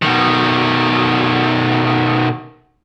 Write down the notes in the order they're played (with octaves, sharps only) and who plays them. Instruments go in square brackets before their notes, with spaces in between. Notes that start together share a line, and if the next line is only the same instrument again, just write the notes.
[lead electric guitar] B2 D#3